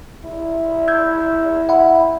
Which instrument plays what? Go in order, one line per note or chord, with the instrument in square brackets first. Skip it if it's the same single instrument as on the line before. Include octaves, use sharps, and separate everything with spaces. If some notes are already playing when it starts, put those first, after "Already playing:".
[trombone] E4
[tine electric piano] E6 G6 G#6
E5 F#5 B5